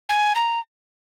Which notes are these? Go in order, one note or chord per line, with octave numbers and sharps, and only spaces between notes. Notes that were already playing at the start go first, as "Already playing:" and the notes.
G#5
A#5